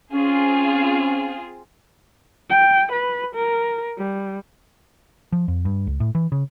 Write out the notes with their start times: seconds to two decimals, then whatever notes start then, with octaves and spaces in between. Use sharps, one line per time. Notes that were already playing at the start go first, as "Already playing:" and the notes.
0.12 C4 C#4 F4 G#4
2.50 G5
2.92 B4
3.35 A#4
3.97 G3
5.32 F3
5.48 F2
5.65 G2
5.87 C#2
6.00 A2
6.15 E3
6.32 C#3